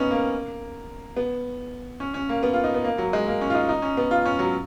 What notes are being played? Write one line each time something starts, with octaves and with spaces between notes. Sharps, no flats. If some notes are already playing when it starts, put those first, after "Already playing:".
Already playing: B3 C#4 D#4
A#3
B3
C#4
C#4
A#3
B3
F4
D#4
B3
A#3
F#3
G#3
A#3
C#4
F4
D#4
D#4
C#4
B3
F4
C#4
F#3